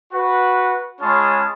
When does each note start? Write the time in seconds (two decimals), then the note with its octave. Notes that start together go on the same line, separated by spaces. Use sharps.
0.13 F#4 B4
1.01 G#3 C#4 F4 G#4 A5 B5